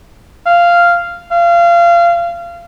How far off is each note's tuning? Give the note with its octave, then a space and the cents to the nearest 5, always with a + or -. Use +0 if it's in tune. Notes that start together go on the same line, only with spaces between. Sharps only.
F5 -10
F5 -25